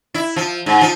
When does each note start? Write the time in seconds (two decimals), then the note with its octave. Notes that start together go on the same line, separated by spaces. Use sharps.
0.14 E4
0.36 F3
0.66 G#2
0.81 F3